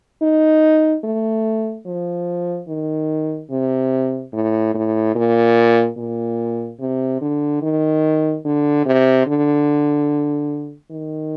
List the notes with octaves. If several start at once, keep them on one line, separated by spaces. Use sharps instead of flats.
D#4
A3
F3
D#3
C3
A2
A2
A#2
A#2
C3
D3
D#3
D3
C3
D3
D#3